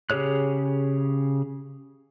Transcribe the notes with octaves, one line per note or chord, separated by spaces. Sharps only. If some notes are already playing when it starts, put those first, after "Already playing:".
C#3 G4 G#4 C#5 F#6